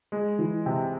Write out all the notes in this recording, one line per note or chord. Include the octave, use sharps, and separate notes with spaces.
G#3
E3
C3